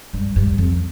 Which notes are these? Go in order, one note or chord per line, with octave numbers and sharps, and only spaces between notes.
G2
G2
F2